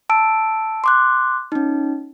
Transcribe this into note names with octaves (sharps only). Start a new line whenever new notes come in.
A5 E6 D7
C6 D6 F#6
C#4 D#4